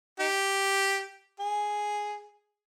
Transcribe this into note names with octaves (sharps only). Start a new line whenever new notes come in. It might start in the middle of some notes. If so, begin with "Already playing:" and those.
D#4 G4
G#4